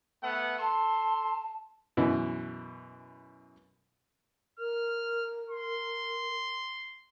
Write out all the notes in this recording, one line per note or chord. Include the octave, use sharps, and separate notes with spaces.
A3 B3 F#5
A4 A5 C6
F#2 B2 E3
A#4 F6
C6